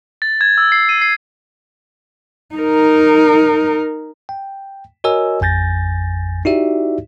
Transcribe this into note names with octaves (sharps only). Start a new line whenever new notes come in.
A6
G#6
E6
C7
D#7
C7
D#4 A#4
G5
F#4 A#4 C#5 D#5 G#5 E6
A1 F2 G#5 G6 A6 A#6
D#4 E4 F#4 G4 D5 E5